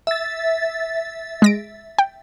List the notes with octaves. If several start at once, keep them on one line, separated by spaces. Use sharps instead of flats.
E5 A6
G#3 A#6 D7
G5